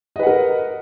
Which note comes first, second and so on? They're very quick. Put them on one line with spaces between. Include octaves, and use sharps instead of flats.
D#5 B4 F#5 A#4